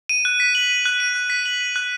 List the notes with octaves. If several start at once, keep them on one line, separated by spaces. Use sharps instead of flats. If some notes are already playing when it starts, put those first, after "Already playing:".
D#7
F#6
B6
F#7
D#7
F#6
D#7
F#6
B6
F#7
D#7
F#6